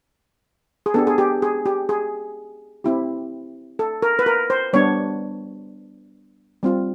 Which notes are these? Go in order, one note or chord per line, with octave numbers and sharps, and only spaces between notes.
G#4
B3 D4 G4 A4
G#4
G4
G#4
G4
G#4
C4 E4 G4
A4
A#4
B4
A#4
C5
G3 B3 D4 C#5
G3 C4 F4